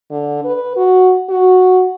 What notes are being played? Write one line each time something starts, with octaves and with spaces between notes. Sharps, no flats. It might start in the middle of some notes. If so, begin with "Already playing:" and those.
D3
B4
F#4
F#4